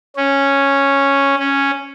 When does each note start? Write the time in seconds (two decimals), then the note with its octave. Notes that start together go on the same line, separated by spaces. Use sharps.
0.17 C#4
1.39 C#4